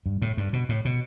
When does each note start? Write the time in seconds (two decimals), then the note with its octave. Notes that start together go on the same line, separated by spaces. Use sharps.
0.06 G2
0.22 A2
0.37 G2
0.53 B2
0.69 A2
0.85 B2